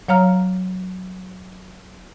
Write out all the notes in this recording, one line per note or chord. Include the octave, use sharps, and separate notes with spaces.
F#3 C#5 F5 A#5 F6